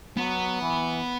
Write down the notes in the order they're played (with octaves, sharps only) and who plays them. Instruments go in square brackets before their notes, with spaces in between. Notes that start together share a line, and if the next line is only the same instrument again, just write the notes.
[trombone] F#3 [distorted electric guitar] B3
[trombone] E3